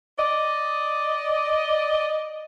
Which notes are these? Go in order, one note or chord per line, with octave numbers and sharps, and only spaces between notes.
D5 D#5